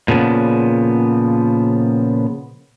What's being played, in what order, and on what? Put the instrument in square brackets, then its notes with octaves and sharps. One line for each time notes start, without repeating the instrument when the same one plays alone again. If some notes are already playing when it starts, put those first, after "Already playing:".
[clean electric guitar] A#2 C#3 F3 B3